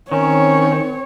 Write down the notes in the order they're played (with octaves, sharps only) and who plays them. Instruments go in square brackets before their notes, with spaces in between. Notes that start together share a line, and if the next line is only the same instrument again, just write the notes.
[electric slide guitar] D#3 [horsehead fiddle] C4 C#5 [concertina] C#4